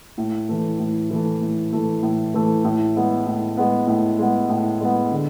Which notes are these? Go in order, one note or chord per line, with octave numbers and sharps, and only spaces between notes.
A2
E3 A3
A2
E3 A3
A2
E3 A3
A2
E3 A3
A2
G#3 B3
A2
G#3 B3
A2
G#3 B3
A2
G#3 B3
D3